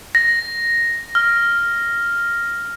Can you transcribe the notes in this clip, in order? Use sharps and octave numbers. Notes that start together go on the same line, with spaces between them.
A#6
F6